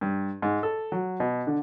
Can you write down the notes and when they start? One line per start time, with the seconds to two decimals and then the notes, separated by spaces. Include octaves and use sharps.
0.01 G2
0.42 G#2
0.63 A4
0.92 F#3
1.20 B2
1.47 D3